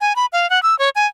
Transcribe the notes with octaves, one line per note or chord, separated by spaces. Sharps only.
G#5
B5
F5
F#5
E6
C#5
G#5